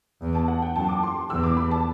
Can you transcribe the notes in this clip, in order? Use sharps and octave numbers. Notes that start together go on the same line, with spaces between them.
E2
A5
F#5
G5
F#2 A5
D6
C6
E2 E6
D6
B5
A5